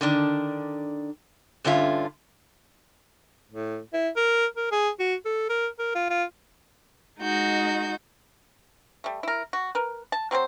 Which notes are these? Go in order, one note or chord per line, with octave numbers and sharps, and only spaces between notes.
D3 D#3 D4
G2 D3 C#4 F4 E5
A2
E4
A#4
A#4
G#4
F#4
A4
A#4
A#4
F4
F4
G#3 D#4 F#4 G6
G3 A3
E4 A#4
F#4
A#4 B4
A5
F#3 C4 A#4 C5